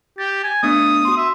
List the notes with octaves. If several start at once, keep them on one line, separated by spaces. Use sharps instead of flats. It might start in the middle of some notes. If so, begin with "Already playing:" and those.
G4 A6
G#5
A3 B3 D4 D#6
F#4 C6
E5